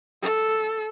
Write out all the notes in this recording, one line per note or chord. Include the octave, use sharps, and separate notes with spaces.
A4